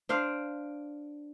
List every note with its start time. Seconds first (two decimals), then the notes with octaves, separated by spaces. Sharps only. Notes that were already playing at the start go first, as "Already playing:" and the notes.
0.09 D4 C5 F5